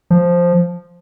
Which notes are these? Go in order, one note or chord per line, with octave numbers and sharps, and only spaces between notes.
F3